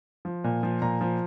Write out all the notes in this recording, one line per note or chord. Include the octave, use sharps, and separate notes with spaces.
F3
A#2
F3
A#2 A#5
F3